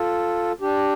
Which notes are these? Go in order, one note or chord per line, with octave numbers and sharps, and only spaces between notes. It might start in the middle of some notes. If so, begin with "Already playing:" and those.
Already playing: F4 A4
D4 G4